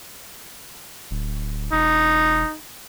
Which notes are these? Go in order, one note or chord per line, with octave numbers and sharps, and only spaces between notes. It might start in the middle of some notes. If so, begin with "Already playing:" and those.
D1
E1 D#4